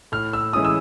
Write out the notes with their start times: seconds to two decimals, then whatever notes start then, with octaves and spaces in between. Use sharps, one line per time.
0.12 A2 F6
0.33 E6
0.53 E3 G#3 C#4 E4 D#6
0.65 E6